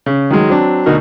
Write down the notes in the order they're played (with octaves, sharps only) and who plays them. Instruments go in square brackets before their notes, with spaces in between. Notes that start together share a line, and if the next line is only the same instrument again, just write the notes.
[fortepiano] C#3
D#3 F#3 G#3
F#3 C4 D4
D2 B2 D#4 F#4 A#4